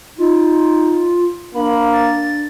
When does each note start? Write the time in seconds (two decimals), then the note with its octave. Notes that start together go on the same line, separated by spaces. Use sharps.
0.18 D#4 F4
1.54 A#3 D4 B5
1.93 A6